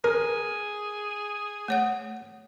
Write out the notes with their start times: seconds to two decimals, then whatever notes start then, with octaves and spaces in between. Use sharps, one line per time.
0.04 G#4 A#4
1.68 A3 C#5 F#5